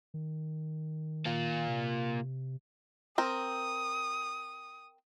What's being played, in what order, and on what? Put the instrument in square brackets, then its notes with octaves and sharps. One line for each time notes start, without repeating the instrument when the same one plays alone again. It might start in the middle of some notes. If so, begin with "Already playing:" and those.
[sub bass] D#3
[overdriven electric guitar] A#3 F4
[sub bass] C3
[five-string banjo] C4 A#4 [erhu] D#6